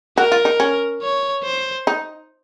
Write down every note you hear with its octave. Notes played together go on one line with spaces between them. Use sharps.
F#4 A#4
F4
D#4
C#4
C#5
C5
D#4